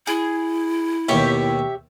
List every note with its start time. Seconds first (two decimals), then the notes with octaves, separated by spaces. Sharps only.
0.07 E4 G#4
1.09 D#2 B2 G4 C#5 E5